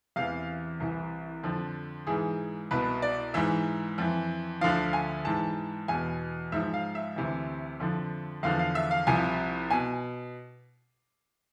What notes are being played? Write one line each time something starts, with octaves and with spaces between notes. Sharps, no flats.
E2 C3 E3 F5
C2 C3 E3
F2 D3 F3
G#2 E3 G#4
C2 B2 B4
D5
G#2 E3 E5
F2 E3
D2 D3 F3 F5
G#5
G#2 E3 A5
E2 B2 G#5
G#2 F3 E5
F5
E5
D2 C3 E3
F2 D3 F3
E2 D3 F3 F5
F5
E5
F5
C2 C3 F3 G#5
B2 G#5